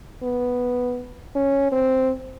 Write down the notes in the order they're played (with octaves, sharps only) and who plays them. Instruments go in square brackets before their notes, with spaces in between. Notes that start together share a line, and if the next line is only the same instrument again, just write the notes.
[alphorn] B3
C#4
C4